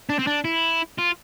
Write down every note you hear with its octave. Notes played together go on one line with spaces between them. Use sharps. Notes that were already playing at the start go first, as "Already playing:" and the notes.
D4
C4
D4
E4
F4